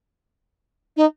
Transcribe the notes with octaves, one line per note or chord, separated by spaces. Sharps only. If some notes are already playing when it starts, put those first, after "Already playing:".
D#4